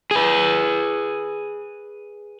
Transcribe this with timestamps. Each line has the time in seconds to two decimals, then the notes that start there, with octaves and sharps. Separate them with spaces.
0.11 G#4 B4